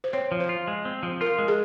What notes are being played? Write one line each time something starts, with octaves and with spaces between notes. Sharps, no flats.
C5
C4 C#5
F3
C5
F4
G#3
C4
F3
F4 A#4
G#3
G#4